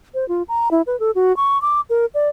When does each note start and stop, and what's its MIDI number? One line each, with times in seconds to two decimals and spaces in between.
0.14 0.27 72
0.29 0.43 65
0.48 0.69 82
0.71 0.82 64
0.87 0.98 71
1.00 1.11 69
1.15 1.35 66
1.37 1.60 85
1.62 1.81 86
1.90 2.06 70
2.14 2.29 74